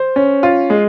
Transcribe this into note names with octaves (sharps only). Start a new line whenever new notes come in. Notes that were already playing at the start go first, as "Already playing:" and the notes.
Already playing: C5
C#4
F4
G#3